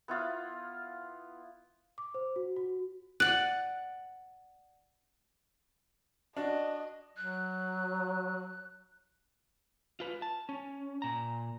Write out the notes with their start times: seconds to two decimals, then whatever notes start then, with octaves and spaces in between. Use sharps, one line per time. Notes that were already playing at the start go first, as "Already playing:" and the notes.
0.08 B3 E4 F4 F5
1.98 D6
2.14 C5
2.36 F#4
2.56 F#4
3.20 D5 F#5 F#6
6.37 D4 F#4 D5 D#5
7.17 F#3 F#6
10.00 F4 B4
10.22 A5
10.49 C#4
11.02 A#2 A#5